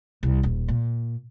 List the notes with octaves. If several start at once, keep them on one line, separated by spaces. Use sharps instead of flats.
C2
D#1
A#2